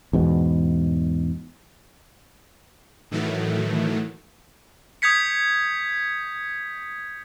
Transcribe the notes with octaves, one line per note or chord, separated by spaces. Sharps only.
E2 G#2 B2
A2 D#3 E3 F#3 A3
D#6 G6 G#6 B6 C#7